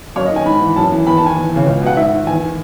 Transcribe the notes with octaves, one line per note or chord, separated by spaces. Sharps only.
F#2 C#5
D#5
D#3
G#5
G#2 B5
E3
F#2 A5
E3
E2 B5
A5
D#3
G#5
E2
C#3 E3
C#2
B2 F#5
G#2 E5
D#3
E2 G#5
D#3